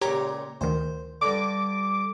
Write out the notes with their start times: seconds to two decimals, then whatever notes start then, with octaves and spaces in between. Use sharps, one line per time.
0.01 C#2 A#2 G4 C#5 A#5 D6
0.61 D2 D#3 C5
1.21 G2 D3 D6